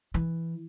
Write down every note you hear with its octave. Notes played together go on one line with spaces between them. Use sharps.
E3